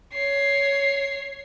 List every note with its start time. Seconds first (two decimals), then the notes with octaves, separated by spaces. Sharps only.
0.13 C#5 C7